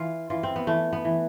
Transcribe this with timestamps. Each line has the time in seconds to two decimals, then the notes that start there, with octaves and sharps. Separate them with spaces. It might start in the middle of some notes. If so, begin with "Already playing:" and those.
Already playing: E3 F4
0.30 E3 F4
0.43 C4
0.56 B3
0.67 E3 A3
0.93 B3
1.05 E3